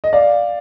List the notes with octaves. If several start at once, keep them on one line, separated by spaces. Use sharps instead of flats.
D#5
D5 F5